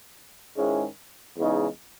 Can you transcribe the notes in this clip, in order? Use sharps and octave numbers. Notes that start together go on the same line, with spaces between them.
G#2 D#3 G#3 C#4 E4
E2 C#3 G#3 D#4